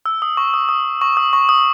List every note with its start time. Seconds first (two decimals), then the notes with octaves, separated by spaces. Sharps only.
0.06 E6
0.22 D#6
0.37 C#6
0.54 D#6
0.69 D#6
1.01 C#6
1.17 D#6
1.33 C#6
1.49 D#6